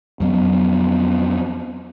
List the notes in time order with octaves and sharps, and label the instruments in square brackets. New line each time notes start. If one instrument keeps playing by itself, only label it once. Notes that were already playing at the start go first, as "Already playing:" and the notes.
[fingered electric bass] F2 F#3 B3